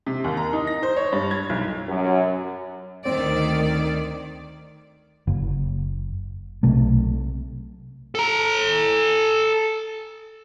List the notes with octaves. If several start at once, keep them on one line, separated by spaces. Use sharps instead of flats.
C3
D#2
A#5
D#4
A#6
C5
C#5
G2
G#6
B1
F#2
D2 D#3 C4 D5
F#1
B1 C3 A3
A4 A#5